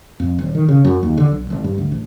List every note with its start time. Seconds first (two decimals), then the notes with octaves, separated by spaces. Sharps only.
0.20 F2
0.38 D#1
0.55 D#3
0.68 C#3
0.85 F#2
1.03 D#2
1.17 D3
1.32 B1
1.50 G#1
1.64 G2
1.78 D2
1.92 A1